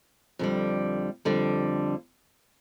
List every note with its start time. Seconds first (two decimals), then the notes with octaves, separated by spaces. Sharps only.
0.39 F2 D3 G3
1.25 F2 D3 G3